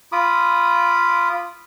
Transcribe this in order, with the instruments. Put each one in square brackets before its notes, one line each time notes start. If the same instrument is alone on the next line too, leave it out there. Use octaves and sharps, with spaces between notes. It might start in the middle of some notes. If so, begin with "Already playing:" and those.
[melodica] F4 B5 D6 D#6